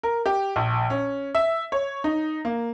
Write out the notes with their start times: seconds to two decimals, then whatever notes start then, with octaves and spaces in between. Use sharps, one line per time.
0.03 A#4
0.26 G4
0.56 A#1
0.90 C#4
1.35 E5
1.72 C#5
2.04 D#4
2.45 A#3